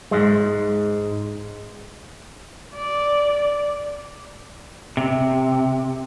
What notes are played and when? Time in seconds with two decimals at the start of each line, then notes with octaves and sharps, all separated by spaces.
0.11 G#2 G#3
2.75 D5
4.97 C3